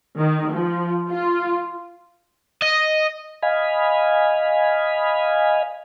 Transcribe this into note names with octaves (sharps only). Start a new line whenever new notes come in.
D#3
F3
F4
D#5
D#5 F5 G#5 B5